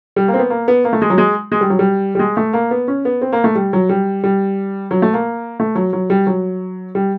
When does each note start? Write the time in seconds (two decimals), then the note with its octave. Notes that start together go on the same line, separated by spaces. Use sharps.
0.16 G3
0.28 A#3
0.34 C4
0.39 B3
0.50 A#3
0.68 B3
0.85 A#3
0.93 A3
1.02 G#3
1.10 F#3
1.18 G#3
1.52 G#3
1.61 G3
1.70 F#3
1.79 G3
2.15 G3
2.19 G#3
2.37 A3
2.53 A#3
2.71 B3
2.88 C#4
3.05 B3
3.21 C4
3.32 A#3
3.44 A3
3.55 G3
3.73 F#3
3.89 G3
4.24 G3
4.91 F#3
5.02 A3
5.14 A#3
5.60 A3
5.75 F#3
5.93 F#3
6.10 G3
6.27 F#3
6.95 G3